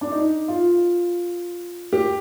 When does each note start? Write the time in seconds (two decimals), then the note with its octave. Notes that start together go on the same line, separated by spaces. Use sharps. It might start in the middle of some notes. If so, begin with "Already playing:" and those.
0.01 D4
0.12 D#4
0.48 F4
1.93 G4